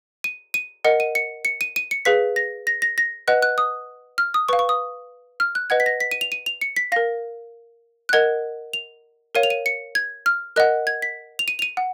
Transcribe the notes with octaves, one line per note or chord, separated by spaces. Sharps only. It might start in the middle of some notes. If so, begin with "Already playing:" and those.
D#7
D#7
A#4 D#5 F#5 C#7
D#7
C#7
C#7
D#7
D#7
C#7
G#4 B4 F5 B6
A#6
A#6
A#6
A#6
B4 D#5 F#5 F#6
F#6
D#6
F6
D#6
B4 F5 C#6
C#6
D#6
F6
F#6
B4 D#5 F#5 G#6
B6
A#6
B6
D#7
F7
D#7
F7
C#7
B6
A#4 F5 A#6
F#6
A#4 D#5 F#5 G#6
F7
A#4 C#5 F5 D#7
F7
D#7
C#7
G#6
F6
A#4 D#5 F#5 F#6
G#6
B6
F7
D#7
F7
D#7
F#5